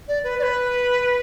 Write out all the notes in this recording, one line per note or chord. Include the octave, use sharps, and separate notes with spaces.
D5
B4
D5
B4